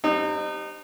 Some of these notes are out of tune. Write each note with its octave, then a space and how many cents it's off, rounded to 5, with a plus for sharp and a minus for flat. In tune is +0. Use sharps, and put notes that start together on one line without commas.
G3 +0 C4 +0 D#4 -30